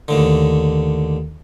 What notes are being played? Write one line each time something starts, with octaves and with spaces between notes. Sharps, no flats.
D#2 A2 D3